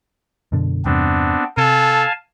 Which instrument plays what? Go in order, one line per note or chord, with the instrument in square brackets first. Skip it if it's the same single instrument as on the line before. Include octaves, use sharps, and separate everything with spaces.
[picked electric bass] F#2 B2 D3
[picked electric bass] E2 G2 C3 [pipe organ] B3 C4 D4
[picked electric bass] C3 [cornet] A4 [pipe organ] F5 G#5 A5